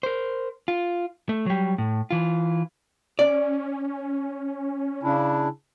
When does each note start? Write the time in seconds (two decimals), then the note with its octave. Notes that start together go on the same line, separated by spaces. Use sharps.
0.03 A#4 C5
0.68 F4
1.29 A3
1.46 F#3 G3
1.78 A2
2.11 E3 F4
3.19 C#4 D5
5.03 C#3 D4 E4